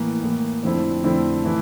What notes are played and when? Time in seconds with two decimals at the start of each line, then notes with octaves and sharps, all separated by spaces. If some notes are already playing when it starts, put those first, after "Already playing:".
Already playing: A2 E3 A#3
0.23 A2 E3 A#3
0.63 F2 D3 A3 C4 E4
1.03 F2 D3 A3 C4 E4
1.44 A2 E3 A3 E4